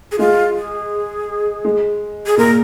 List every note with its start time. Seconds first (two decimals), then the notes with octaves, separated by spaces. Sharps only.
0.12 G#4
0.19 G#3 F4
0.56 G#4
1.65 G#3
2.26 G#4
2.37 A#2 A#4